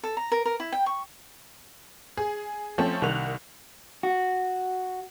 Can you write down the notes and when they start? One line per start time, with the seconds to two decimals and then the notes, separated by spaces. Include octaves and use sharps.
0.03 A4
0.17 A#5
0.32 A#4
0.45 A#4
0.60 E4
0.72 G5
0.86 C#6
2.17 G#4
2.78 F3 A3 C4 C#4
3.02 C2 D#3 F#6 F7
4.03 F#4